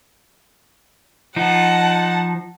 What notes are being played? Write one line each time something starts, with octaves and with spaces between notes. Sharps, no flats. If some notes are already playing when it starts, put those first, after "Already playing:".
F3 D#4 F#5 A5